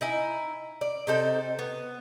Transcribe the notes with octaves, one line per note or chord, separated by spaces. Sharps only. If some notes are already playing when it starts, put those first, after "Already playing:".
D#4 E4 G#5
D5
C3 D#4 A4 C5
B3